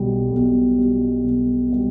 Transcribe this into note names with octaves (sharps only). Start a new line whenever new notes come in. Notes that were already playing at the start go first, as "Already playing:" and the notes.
Already playing: B1 B2 G3
B1
B2 G3
B1
B2 G3